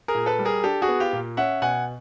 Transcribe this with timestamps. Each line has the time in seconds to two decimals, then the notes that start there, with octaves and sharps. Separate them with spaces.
0.08 G#4 A#4
0.15 A#2
0.26 A4 B4
0.39 G3
0.45 G#4 A#4
0.64 D4 G4 A4
0.82 F#4 G#4
0.88 B3
1.00 F4 G4
1.13 A#2
1.37 C#4 E5 F#5
1.62 B2 F#5 G#5